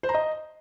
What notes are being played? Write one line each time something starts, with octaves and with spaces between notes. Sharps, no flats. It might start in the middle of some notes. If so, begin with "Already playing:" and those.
C5
A#5
D#5